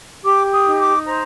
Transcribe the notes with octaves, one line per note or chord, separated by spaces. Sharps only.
G4 D6
D#6
D#4
D6
C5 A#5